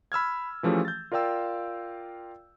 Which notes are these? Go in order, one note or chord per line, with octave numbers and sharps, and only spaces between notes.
B5 E6 F6 G#6
E3 F3 A3 C#4 G4 G#4
G6 A6
F4 A#4 D5 F5 G5 E6